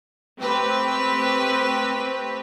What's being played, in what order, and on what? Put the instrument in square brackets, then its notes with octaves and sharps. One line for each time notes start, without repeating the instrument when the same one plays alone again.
[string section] A3 C4 G4 B4